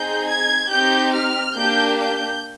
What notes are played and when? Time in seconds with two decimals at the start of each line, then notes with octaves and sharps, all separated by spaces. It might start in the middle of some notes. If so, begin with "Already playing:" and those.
Already playing: C4 D#4 G#4 G6
0.28 G#6
0.70 C4 D#4 G4 G6
1.14 F6
1.56 A#3 D4 G4 G6
1.99 G6